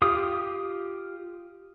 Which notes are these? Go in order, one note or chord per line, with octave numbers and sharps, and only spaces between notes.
F4 G4 D#6